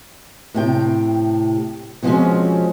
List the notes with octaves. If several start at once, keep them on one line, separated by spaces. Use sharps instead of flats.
A2 C3 G5
B2 F3 G3 G#3 C4 C#4